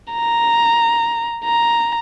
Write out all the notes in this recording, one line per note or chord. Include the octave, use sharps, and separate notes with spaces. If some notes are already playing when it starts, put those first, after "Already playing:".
A#5
A#5